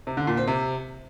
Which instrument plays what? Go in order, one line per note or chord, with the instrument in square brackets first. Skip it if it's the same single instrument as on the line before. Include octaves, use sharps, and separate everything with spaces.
[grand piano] C3
D3
A#2
C4
C3